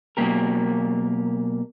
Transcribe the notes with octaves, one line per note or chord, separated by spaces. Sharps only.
B2 F#3 A#3 G4 A#4